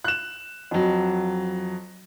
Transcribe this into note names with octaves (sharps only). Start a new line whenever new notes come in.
F#6 E7
F2 F#3